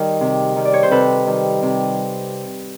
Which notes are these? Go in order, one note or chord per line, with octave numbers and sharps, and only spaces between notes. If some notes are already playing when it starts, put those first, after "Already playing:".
Already playing: D#3 G3 G#4 A#4
C3
D#3 G3
D5
C#5
C5
C3 A4 B4
D#3 G3
C3